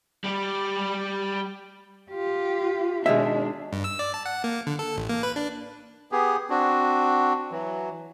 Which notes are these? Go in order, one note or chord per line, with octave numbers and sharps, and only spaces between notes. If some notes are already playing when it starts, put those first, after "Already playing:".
G3 G4
F4 G4
B2 D#3 G#3 D4 E5
G2
E6
D5
A5
F#5
A#3
D3
A4
A1
A#3
B4
D4
B3 G4 G#4
C4 D4 F#4
E3 F#3